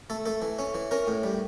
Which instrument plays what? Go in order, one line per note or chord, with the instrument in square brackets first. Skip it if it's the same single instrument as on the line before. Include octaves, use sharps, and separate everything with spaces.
[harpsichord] A3 A4
A3 A4
E3
C#4
E3
C#4 A#4
A2
G3